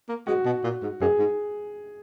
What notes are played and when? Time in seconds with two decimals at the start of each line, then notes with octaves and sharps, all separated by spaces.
0.09 A#3
0.27 G#3 F#4
0.45 B2
0.64 A#2
0.83 G#2
1.01 F#2 G#4
1.19 G#2